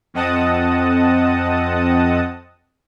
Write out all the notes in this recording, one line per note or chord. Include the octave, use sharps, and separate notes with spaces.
F2 C4 D#5 F#5 A5 D#6